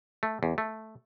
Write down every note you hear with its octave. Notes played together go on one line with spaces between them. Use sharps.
A3
E2
A3